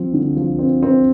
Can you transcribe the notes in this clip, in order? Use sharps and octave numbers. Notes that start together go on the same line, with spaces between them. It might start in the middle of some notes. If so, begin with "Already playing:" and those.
Already playing: F3 C4
D3
F3
C4
C4